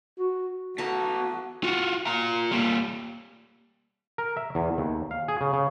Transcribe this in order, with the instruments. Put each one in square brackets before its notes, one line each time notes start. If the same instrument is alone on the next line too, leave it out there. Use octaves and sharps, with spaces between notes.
[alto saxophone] F#4
[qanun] A3 F5 A5 [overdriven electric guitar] B3 A#5 [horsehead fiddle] F#4
[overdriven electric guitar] F4 F#4
F4 A#5
G3 A#3
[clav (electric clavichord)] A#4
E5
E2
D#2
F5
G#4
C#3
C#3